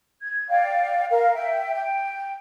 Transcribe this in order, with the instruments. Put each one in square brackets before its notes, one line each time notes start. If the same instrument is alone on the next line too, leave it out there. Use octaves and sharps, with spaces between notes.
[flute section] G#6
D5 F5 G5
A#4 F5
E5 G5
G5